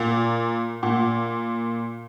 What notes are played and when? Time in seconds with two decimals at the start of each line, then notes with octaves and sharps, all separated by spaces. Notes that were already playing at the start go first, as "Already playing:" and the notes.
Already playing: A#2
0.83 A#2